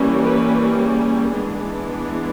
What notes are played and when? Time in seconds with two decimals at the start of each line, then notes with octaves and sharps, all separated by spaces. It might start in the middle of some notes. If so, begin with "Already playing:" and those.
Already playing: E3 G3 A#3 C#4
0.23 B4
0.78 G#4
1.33 E3 G#3 B3 D4